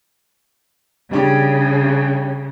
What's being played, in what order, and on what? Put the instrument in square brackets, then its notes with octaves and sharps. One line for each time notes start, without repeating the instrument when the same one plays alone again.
[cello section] C#3 [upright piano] G3 D4 G4